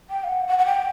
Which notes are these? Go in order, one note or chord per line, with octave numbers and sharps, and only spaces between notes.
G5
F5
F#5
F#5
F#5
G5